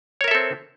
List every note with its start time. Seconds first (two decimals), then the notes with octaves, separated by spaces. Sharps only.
0.21 C#5
0.24 A#4
0.28 E5
0.31 A4
0.35 C4